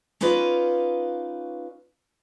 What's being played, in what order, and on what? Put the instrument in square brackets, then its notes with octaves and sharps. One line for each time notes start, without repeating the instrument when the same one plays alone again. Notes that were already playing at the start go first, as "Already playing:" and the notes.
[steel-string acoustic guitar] C#4 D#4 F4 B4 D5